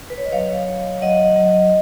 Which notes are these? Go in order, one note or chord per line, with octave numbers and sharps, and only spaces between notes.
B4
C#5
D#5
F#3 C#5 F5
F#3
F#3 D#5 F#5
F#3